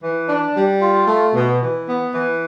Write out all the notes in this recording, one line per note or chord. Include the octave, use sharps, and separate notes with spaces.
E3
D4
G3
F4
A3
B2
E3
B3
E3